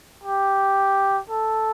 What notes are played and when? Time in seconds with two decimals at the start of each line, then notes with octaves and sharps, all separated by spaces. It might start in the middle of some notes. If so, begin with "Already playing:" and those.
0.23 G4
1.30 A4